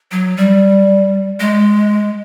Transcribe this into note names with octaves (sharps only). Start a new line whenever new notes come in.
F#3
G3
G#3